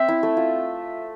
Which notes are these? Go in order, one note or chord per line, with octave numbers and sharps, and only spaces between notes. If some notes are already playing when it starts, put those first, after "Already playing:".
Already playing: C4 E5
E4
A3
F4